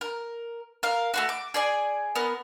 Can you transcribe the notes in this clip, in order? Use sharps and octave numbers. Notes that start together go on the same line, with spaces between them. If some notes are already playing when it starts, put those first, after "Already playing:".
A#4
A#4 F5
A3 A#3 F#4
D6
G#4 D5 G#5
B3 A#4